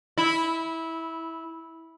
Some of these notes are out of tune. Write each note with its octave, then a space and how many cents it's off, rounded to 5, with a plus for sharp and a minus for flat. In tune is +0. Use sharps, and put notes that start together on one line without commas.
E4 -15